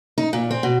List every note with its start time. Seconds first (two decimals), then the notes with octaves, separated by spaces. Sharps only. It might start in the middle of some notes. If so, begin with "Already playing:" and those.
0.18 D#4
0.33 A#2
0.51 C4
0.63 B2